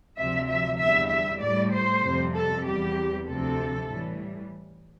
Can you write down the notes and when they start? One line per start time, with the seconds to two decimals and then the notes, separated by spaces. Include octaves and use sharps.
0.17 D2 C3 F3 E5
0.48 E5
0.79 E2 D3 G3 E5
1.10 E5
1.41 A2 G3 D5
1.72 C5
2.03 F2 C3 G3
2.34 A4
2.65 E2 C3 E3 G3 G4
3.26 D2 C3 F3 A4
3.88 A2 E3 G3